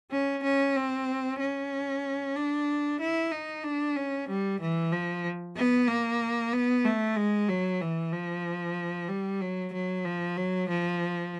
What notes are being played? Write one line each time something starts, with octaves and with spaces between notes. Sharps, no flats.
C#4
C#4
C4
C#4
D4
E4
D#4
D4
C#4
G3
E3
F3
B3
A#3
B3
A3
G#3
F#3
E3
F3
G3
F#3
F#3
F3
F#3
F3